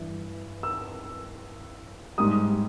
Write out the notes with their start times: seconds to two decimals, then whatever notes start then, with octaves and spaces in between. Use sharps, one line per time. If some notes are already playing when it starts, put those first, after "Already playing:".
Already playing: G2 E3
0.63 E6
2.18 G#2 G3 D#6